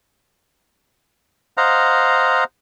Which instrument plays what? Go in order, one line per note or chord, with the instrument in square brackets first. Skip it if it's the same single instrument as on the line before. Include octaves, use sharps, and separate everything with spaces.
[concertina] C5 D#5 F5 F#5 A#5